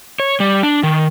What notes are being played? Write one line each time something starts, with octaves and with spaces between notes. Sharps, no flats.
C#5
G3
D4
D#3